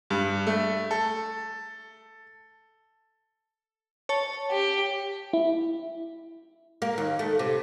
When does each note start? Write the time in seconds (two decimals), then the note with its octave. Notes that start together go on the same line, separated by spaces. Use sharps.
0.10 G2
0.47 A3
0.91 A4
4.09 C#5 A5
4.51 G4
5.33 E4
6.82 A#3
6.98 D#2
7.19 A3
7.39 C3